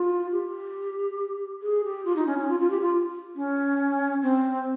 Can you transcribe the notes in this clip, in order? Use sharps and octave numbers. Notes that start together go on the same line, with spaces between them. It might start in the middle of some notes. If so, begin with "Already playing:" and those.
Already playing: F4
G4
G#4
G4
F4
D#4
C#4
C#4
F4
F4
G4
F4
C#4
C4